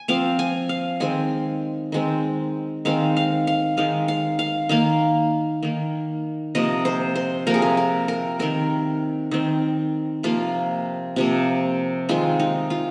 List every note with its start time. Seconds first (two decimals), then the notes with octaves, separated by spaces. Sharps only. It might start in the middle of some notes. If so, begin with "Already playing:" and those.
Already playing: G#5
0.08 F3 C4 F5
0.39 G#5
0.69 F5
1.00 D#3 G#3 C4 G#5
1.92 D#3 G#3 C4
2.85 D#3 G#3 C4 F5
3.17 F5
3.47 F5
3.77 D#3 G#3 C4 F5
4.08 F5
4.39 F5
4.69 D#3 A#3 F5
5.63 D#3 A#3
6.55 C3 F3 A#3 D#5
6.85 C5
7.15 C5
7.47 C3 F3 A#3 A#4
7.54 G#4
7.62 A#4
7.77 A#4
8.08 A#4
8.39 D#3 C4 A#4
9.31 D#3 C4
10.23 C3 F3 A#3 F4
11.16 C3 F3 A#3
12.09 D#3 G#3 C4 F4
12.40 D#4
12.70 F4